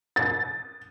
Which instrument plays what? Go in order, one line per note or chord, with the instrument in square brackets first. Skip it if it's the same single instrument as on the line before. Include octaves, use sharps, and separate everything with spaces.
[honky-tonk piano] A6